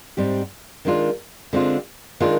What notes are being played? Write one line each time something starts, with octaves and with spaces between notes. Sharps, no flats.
G#2 G3 C4 G4
D#3 G#3 D4 F4
D3 G#3 C4 F4
D#3 G#3 D4 F4